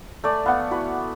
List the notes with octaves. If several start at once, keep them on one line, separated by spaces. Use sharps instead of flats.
A3 D5 G#5
B3 F5 F#5
E4 F#4 B4